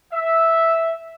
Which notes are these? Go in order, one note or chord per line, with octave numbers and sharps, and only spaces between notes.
E5